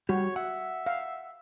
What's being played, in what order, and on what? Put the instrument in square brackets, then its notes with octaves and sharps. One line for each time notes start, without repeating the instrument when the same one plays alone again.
[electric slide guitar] G3 G4 [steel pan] F#4 [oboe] C#5
[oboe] E5 [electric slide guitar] F#5
[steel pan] F5